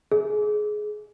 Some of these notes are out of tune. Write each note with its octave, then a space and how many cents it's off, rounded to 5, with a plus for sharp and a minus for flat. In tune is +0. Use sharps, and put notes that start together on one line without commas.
G#4 +20